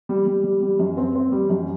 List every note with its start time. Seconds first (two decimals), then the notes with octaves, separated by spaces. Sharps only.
0.09 G3
0.27 G3
0.44 G3
0.62 G3
0.79 F#2
0.97 C4
1.15 C4
1.32 G3
1.49 F#2